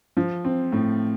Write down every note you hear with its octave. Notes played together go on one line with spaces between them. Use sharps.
F3
C4
A2